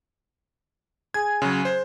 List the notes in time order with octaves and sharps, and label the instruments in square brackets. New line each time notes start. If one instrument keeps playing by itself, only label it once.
[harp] G#4 G#5 [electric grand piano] G#6
[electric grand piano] C#3 F#3 [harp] C6 F#6 A#6
[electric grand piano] C5